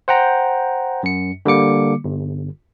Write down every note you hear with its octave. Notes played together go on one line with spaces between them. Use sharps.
C5 F#5 G5 A#5
F#2 C#7
D3 G3 A#3 D6 C#7
G1